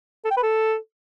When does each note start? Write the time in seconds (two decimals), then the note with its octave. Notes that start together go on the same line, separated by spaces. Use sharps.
0.25 A4
0.31 G5
0.37 B4
0.43 A4